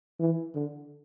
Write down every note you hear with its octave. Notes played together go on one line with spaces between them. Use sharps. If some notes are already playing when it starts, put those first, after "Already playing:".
E3
D3